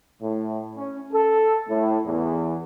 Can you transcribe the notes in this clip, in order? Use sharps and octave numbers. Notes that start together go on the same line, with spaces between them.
A2
C#4
A4
A2
E2